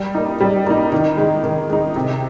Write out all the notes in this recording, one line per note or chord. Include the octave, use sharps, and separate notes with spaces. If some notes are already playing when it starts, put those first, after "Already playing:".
Already playing: G3
A#3 D#4
G3
A#3 D#4
D#3
G#3 D#4
D#3
G#3 D#4
C3